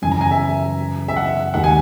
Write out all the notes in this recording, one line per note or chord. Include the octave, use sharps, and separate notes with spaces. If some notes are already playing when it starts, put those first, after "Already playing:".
F#2 C#3 E3 G#5
A#5
G#5
E5
E5
F#5
D#2 D#3 G#3 F#5
G#5